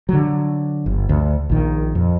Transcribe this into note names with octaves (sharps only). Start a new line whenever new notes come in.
D3 F#3
G1
D2
A#1 D#3
F2